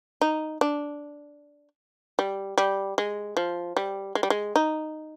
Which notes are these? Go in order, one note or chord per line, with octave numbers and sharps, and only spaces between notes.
D#4
D4
G3
G3
G#3
F3
G3
G#3
G3
G#3
D#4